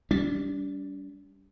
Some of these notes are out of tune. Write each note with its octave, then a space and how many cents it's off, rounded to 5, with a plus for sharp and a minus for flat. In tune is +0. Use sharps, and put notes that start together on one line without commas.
G3 +0 D4 -45